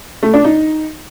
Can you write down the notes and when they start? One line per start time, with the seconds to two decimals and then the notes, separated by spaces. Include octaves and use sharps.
0.23 A3
0.34 D4
0.44 D#4